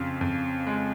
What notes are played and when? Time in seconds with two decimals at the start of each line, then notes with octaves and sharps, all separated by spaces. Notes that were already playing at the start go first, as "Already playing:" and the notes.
Already playing: F2 C#3 F4
0.21 F2
0.67 G#3